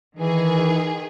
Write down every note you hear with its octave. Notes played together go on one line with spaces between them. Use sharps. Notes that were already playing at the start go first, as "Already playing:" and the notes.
D#3 E3 G#4